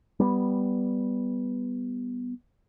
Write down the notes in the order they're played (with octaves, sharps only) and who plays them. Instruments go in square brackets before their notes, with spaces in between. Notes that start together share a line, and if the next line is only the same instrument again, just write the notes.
[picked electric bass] G3 B3